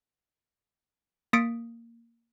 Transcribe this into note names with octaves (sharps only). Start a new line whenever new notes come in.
A#3 D#6 A6 B6 C#7 D7